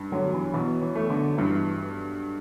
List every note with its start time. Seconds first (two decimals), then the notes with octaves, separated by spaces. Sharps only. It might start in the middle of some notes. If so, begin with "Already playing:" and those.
Already playing: G2
0.12 D3 F#3
0.33 E3
0.54 B2 E3
0.82 E3
0.95 A3
1.10 D3
1.38 G2 E3